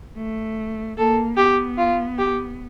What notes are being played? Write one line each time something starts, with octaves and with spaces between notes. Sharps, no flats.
A3
A#3 A4
B3 G4
F4
G4